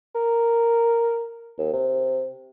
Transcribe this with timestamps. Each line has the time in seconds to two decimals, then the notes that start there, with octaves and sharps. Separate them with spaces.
0.15 A#4
1.58 D#2
1.73 C3